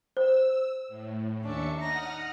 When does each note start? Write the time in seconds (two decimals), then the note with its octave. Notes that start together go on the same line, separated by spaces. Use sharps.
0.17 C5 E6
0.88 A2
1.41 D#2 C#4 D4 E5 C#7
1.81 D#4 F#5 D#6 F6 A#6